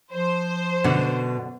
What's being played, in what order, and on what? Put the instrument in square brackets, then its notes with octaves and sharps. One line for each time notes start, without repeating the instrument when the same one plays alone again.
[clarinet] F3 [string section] C5
[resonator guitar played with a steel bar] F#2 D3 [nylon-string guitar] B2